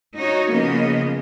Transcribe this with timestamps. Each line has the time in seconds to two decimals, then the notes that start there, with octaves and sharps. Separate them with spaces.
0.15 D#4 F#4 C#5
0.49 C#3 F3 A#3 B3 D#5